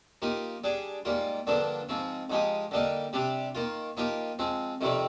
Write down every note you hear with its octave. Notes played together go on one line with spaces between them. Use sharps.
F3 A#3 D#4 G4
G3 D4 G#4
G#2 G3 A#3 F4
G2 D3 F3 A#3 D4
G#2 F3 C4
G#2 F3 G#3 D#4 G4
D3 G3 A#3 D#4 A#4
C3 G3 D4 G4
D#3 A#3 F4
F3 A#3 D#4 G4 A#4
F3 G#3 C4
F2 C3 D#3 G3 C4